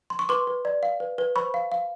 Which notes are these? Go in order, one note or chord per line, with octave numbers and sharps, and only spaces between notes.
C6
C#6
B4 C6 D6
B4
D5
F5
B4
B4
C5 B5 C#6
F5
F5